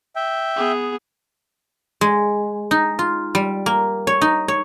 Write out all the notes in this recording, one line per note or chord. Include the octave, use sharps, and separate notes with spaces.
E5 G5
B3 G#4
G#3
D#4
F4
G3
A#3
C#5
D#4
C#5